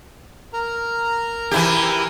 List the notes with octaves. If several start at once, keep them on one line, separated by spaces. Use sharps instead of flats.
A#4 A#5
E3 E4 G4